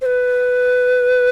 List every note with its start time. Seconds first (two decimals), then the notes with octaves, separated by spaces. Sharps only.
0.01 C5
0.06 B4